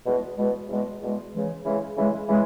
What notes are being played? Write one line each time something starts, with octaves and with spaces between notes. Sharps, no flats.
E2 B2 G#3
E2 B2 G#3
E2 B2 G#3
E2 B2 G#3
C#3 E3 G#3
C#3 E3 G#3
C#3 E3 G#3
C#3 E3 G#3